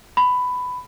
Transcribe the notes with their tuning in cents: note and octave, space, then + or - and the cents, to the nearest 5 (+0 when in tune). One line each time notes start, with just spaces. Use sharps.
B5 +15